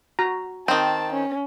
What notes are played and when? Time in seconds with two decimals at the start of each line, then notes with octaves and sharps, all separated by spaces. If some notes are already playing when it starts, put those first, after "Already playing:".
0.19 F#4 A#5
0.68 D#3 C4 A5
1.13 C#4